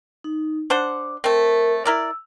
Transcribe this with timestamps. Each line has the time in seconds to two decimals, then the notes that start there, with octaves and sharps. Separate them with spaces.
0.24 D#4
0.70 D4 C5 F#5 D6
1.24 A3 C4 A#4
1.85 E4 A#4 D5 E6